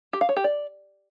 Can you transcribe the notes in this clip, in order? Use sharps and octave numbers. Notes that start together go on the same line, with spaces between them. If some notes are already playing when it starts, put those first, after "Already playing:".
G4
F5
C#5
G4
D5